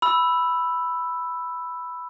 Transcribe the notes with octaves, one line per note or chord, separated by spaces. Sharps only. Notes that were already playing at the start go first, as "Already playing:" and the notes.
B5 E6